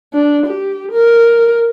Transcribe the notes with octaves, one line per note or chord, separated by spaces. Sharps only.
D4
G4
A#4